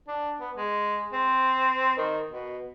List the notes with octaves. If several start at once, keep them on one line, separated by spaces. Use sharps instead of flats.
D4
B3
G#3
C4
D#3
B2